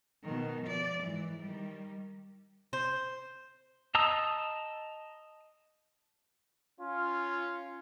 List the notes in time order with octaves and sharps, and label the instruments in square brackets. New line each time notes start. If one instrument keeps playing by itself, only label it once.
[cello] B2 D#3
F3 D5
G#2 E3
D#3 G3
[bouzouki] C5
[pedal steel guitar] D#5 A5 A#5 D#6 E6
[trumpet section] C#4 F4